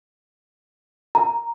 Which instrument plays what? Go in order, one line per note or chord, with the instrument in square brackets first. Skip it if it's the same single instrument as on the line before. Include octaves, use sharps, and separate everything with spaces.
[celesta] A#5